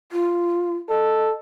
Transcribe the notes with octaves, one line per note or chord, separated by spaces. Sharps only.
F4
A4 D#5